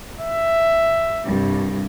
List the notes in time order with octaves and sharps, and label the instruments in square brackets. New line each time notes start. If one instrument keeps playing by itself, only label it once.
[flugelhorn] E5
[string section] C2 G2